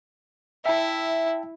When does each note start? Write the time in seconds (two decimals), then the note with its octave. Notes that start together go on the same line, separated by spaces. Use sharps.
0.66 E4 E5 G5 A5